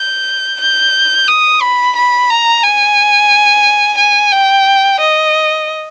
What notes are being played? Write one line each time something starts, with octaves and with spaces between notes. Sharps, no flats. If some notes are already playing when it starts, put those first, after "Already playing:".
Already playing: G6
G6
D#6
B5
B5
A#5
G#5
G#5
G5
D#5